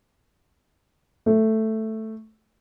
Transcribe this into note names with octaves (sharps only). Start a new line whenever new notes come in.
A3